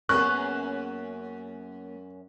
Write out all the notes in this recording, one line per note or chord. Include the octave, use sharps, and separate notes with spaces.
F#2 A#3 B3 C#4 G#4 C#6 F#6